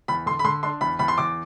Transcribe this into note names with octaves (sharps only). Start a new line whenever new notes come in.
E2 B5
D3 C6
B5
D3 C6
D4 C6
E2 B5
E2 B5
C6
E2 D6